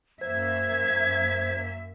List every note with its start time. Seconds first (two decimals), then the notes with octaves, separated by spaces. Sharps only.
0.21 F#2 A#3 C5 E5 G#6